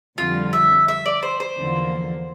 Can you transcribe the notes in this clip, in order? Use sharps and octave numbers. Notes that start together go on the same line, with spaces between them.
F2 D3 G3 F4
E5
E5
D5
C5
C5
E2 D3 F3 A#3